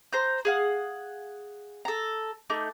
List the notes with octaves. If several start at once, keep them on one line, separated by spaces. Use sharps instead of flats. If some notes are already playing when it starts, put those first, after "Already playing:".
C5 A#5 G6
G#4 F5 F#5
A4 A#5
A3 D#4 D6